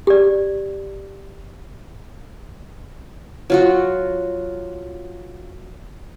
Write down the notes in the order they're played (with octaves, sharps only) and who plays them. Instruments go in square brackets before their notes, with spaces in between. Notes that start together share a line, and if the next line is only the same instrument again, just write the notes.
[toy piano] G4 D5
[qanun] F#3 F4 F#4